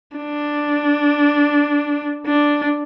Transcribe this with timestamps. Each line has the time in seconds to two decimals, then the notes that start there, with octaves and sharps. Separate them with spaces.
0.17 D4
2.27 D4